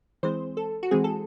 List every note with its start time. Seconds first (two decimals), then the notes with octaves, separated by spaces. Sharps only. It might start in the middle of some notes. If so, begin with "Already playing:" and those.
0.23 E3 G#3 C4 C5
0.57 A4
0.83 F#4
0.91 E3 G#3 C4 G#4
1.04 A4